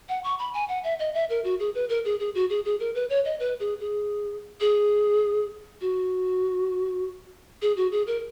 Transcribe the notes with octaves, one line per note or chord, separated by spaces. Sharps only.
F#5
C#6
B5
G#5
F#5
E5
D#5
E5
A#4
F#4
G#4
B4
A#4
G#4
G#4
F#4
G#4
G#4
A#4
B4
C#5
D#5
B4
G#4
G#4
G#4
F#4
G#4
F#4
G#4
A#4